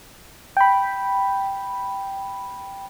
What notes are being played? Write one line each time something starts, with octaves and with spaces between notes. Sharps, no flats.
G5 B5